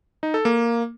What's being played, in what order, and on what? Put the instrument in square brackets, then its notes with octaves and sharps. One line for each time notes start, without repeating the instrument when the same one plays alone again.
[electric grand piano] D#4
A4
A#3